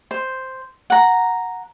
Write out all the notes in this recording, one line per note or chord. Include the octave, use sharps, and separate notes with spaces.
C5
F#5 A#5